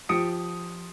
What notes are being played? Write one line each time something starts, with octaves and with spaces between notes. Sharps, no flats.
F3 G4 D#6 C#7 D7